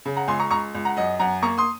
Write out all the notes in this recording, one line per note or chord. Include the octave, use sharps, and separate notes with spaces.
C#3
F#5 A#5
C#2 G#5 C6
A#5 C#6
C#2 A#5 C#6
C#2
F#5 A#5
F#2 D#5 F#5
F#2 F#5 A#5
A#3 A#5 C#6
C6 D#6